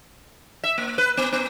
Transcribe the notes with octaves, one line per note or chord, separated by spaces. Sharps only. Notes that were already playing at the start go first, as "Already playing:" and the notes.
E5
A#3
B4
B3
B3